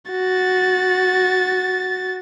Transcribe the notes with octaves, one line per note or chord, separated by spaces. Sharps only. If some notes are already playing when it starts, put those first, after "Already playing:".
F#4 A6